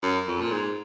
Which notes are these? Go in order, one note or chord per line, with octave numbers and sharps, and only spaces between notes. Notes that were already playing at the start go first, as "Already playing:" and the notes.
F#2
F2
A#2
G#2